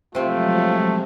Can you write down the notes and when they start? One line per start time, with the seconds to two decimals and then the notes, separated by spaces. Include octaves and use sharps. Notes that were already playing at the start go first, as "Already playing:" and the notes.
0.15 C3 F3 F#3 G#3 A3 C4 F4